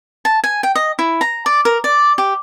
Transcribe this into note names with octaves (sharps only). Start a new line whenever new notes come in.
A5
G#5
G5
D#5
E4
A#5
D5
A#4
D5
G4